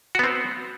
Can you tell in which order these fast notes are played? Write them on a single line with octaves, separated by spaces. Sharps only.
F#4 B3 C4